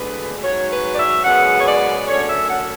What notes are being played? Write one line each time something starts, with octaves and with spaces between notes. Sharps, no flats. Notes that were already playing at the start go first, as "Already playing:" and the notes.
Already playing: D2 D3 G#3 B3 B4
G#2 F#3 C#4 C#5
B4
D5
E5
F#2 C#3 G#3 B3 F#5
C#5
D5
F#2 D3 A3 C#4 C#5
E5
F#5